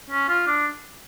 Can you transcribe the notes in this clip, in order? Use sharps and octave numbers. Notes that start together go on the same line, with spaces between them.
C#4
F4
D4